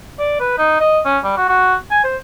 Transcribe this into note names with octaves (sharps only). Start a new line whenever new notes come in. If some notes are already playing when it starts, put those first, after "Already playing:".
D5
B4
D#4
D#5
C#4
G3
F#4
F#4
G#5
C5